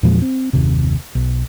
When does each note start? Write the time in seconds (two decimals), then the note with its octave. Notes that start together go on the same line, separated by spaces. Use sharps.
0.03 E2 A#2 F3 G#3
0.22 C4
0.53 F#1 D#2 C3
1.15 B1